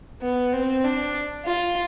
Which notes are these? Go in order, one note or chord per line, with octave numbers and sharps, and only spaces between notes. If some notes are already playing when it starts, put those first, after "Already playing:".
B3
C4
D4
F4